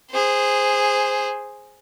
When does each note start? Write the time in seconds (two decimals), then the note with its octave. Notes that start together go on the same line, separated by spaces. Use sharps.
0.10 G#4 C5